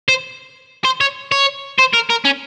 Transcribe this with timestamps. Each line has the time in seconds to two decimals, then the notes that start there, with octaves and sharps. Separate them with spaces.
0.08 C5
0.85 C5
1.01 C#5
1.32 C#5
1.78 C5
1.93 A#4
2.10 A#4
2.25 C#4